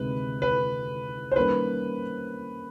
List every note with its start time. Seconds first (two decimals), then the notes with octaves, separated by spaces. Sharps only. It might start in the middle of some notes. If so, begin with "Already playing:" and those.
Already playing: D2 C3 D#3 G#3 C4 B4
0.42 B4
1.32 C5
1.36 D#3 G3 A#3 C#4 B4